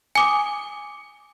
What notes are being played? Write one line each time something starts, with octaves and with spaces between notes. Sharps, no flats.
G#5 D6 D#6